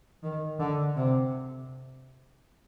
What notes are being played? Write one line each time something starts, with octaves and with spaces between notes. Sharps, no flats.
D#3
D3
C3